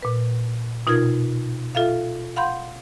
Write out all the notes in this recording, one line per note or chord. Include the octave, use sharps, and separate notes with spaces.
A#2 B4
B2 D#4 F4 A#4 G#6
F4 A4 E5 F5
F5 F#5 B5 C6 G6